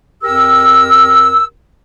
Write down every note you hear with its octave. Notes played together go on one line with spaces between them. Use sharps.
F2 G4 A#4 E6